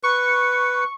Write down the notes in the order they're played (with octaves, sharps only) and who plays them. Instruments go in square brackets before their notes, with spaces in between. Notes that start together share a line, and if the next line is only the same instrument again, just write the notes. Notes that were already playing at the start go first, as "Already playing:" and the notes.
[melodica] B4 [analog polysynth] C#6